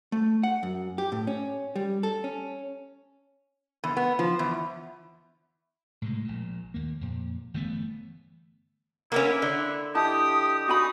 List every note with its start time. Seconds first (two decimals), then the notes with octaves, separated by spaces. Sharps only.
0.12 A3
0.43 F#5
0.63 F#2
0.98 G4
1.12 A2
1.27 C#4
1.76 G3
2.03 A4
2.24 C#4
3.84 E2
3.97 B3
4.19 F3
4.39 E2
6.02 A2 C3 G#3
6.25 A#1 A#2
6.74 D#2 A#3
7.01 F2 A#2
7.54 G1 E3 A3 B3
9.12 A#3 B3 C#4 E4 A#4
9.42 D3
9.95 E4 G4 D#5 A5 D#6
10.68 D#4 F#4 G#5 B5 D#6